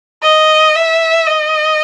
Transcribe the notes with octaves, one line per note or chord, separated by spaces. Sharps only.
D#5
E5
D#5